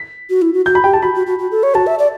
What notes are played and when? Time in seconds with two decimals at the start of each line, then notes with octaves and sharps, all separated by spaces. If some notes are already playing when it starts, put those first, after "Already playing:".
Already playing: B6
0.30 F#4
0.42 E4
0.54 F#4
0.66 F#4 G6
0.75 B5
0.84 G4 G5
0.93 A5
1.02 F#4 B5
1.15 F#4
1.27 F#4
1.39 F#4
1.51 A4
1.63 C#5
1.75 F#4 A5
1.87 E5
1.99 D5